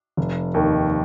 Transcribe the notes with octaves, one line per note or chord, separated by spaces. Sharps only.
F1
D#2 D#3